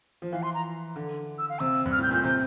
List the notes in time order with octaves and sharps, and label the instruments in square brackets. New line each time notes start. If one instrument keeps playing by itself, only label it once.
[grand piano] F3
[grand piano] E3 [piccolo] F5
[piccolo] C6
A#5
[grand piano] D3
[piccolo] E6
F5
[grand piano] C3 [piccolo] E6
[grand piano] G2
[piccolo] F6
[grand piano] A2 [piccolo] G6
[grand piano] A#2 [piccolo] G6
[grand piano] C3 [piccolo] G6